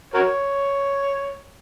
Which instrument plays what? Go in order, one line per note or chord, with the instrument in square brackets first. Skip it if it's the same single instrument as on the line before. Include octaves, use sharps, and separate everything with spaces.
[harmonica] F#4 A#4 C#5